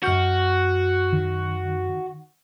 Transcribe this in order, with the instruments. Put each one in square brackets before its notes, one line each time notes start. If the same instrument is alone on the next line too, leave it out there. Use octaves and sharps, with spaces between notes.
[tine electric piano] F#2 F6 G6 [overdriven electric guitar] F#4
[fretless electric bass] D#3